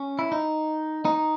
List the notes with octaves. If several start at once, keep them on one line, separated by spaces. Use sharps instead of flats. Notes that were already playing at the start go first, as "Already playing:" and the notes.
Already playing: C#4
E4
D#4
D#4